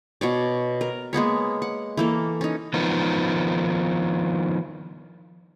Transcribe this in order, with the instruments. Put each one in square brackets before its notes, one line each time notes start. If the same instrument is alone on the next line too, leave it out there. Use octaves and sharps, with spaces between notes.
[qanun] B2 C#5 D5
A#4
G#3 A#3 B3 C#5
F#5
E3 A#3 A4
C#4 D#4
[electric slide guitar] D#3 F3 B3 D#4